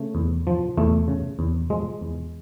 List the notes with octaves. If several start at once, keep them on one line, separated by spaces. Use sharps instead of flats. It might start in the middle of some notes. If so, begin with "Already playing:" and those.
Already playing: C#3 A3
E2
F3
E2 A3
C#3
E2
F3 G#3
E2